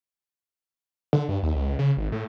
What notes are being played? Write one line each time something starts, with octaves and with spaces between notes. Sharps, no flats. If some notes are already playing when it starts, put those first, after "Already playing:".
D3
G2
D#2
C#2
C#3
G#1
A2